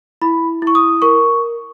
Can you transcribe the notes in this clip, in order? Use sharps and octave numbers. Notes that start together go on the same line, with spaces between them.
E4 B5
E4
C#6
D#6
A#4 C#6